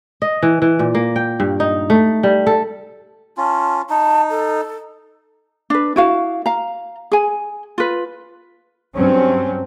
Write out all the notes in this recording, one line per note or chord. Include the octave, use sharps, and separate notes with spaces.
D#5
E3
E3
A#2
A#3
G5
G2
D#4
A3
G3
A4
C#4 F4 A5
D#4 A5
A4
D4 B4
E4 F#4 F5
F5 A#5
G#4 G#5
F4 B4
G2 F#3 C4 C#4